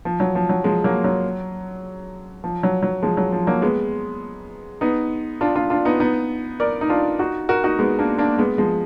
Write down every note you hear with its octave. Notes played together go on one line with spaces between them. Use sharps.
F3
F#3
F3
F#3
F3 G#3
F#3 A#3
F#3
F3
F#3
F#3
F3 G#3
F#3
F3
F#3 A#3
G#3 B3
B3 D#4
D4 F4
D4 F4
D4 F4
B3 D#4
B3 D#4
A#4 D5
D#4
D4 F4
D#4 F#4
F#4 A#4
D#4 F#4
G#3 B3
A#3 D4
A#3 D4
G#3 B3
F3 G#3